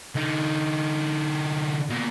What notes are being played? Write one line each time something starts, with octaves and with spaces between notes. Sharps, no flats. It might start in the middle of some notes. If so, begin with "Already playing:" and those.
D3 D#4
B2 A#3